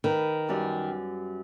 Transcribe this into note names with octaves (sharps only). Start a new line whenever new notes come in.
D#3 B4
F#2 G3